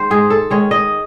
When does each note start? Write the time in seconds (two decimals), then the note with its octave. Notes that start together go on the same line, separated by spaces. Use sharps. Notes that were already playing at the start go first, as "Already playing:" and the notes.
Already playing: D#3 G#3 C5
0.10 G#2 G#4
0.30 A4
0.50 D#3 G#3 C#5
0.71 D#5